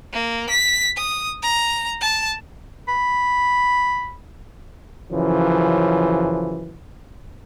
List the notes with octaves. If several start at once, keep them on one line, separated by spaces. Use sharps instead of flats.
A#3
B6
D#6
A#5
A5
B5
F#2 C#3 E3 F3